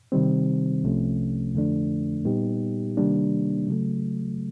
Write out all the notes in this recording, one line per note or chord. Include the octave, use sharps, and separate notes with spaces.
C3 D#3 G3 C4
C2 C3 F3 A3 C#4
F2 D3 F3 A3 D4
A#2 G3 B3 D#4 G4
C3 D#3 G3 A#3 D4
C#3 F#3 A3